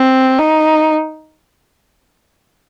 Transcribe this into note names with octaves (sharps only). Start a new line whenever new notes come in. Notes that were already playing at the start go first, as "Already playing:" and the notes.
Already playing: C4
D#4